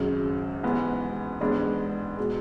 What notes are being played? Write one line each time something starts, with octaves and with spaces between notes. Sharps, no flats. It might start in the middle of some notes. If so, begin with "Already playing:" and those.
Already playing: G#1 F#2 C#3 G#3
A1 G#2 E3 B3
A1 G#2 G#3 B3 D4
B2 G#3